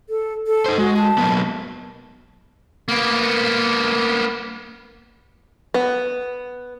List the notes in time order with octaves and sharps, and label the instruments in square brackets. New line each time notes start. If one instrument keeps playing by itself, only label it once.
[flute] A4
A4
[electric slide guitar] D#4 C5
[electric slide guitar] G#3 [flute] F#4
[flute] A5
[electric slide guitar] F#3 A#3 B3
[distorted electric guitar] A#3 B3
[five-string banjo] B3